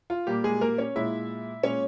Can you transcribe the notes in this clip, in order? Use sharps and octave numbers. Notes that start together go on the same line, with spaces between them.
F4
A#2 G3 A#3 G4
G#3 G#4
A#3 A#4
C#4 C#5
A#2 G#3 E4 E5
A#2 G#3 C#4 C#5